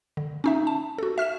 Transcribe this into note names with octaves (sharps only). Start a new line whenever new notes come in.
D3
C#4 D#4 E5
A5
F#4 A4
E5 F6 B6 E7